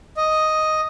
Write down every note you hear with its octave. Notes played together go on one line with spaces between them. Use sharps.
D#5